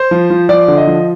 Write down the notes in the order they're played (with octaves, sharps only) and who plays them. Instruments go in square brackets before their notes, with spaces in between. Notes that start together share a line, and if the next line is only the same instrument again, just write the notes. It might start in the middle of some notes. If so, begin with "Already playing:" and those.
Already playing: [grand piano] C5
F3
F3
F3 D5
D3
D#5
F3